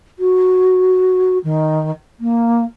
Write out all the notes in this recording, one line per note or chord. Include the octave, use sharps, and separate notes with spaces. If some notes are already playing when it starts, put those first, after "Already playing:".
F#4
D#3
A#3